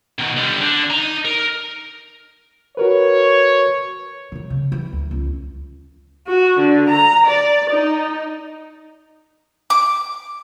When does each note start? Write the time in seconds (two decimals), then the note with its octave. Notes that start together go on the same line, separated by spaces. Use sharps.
0.19 B2 D#3
0.37 D3 G3
0.61 D3
0.90 D#4 A#5
1.25 A#4
2.77 F#4 A#4 B4 C#5
4.32 D#3 G#3
4.50 C#3
4.72 E3
4.92 D2
5.11 C#2 C#4
6.28 F#4
6.60 D3
6.90 A#5
7.27 D5
7.70 D#4
9.70 D6